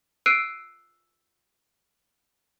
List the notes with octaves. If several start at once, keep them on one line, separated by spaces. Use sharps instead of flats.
E6 F#6 C7 D7 D#7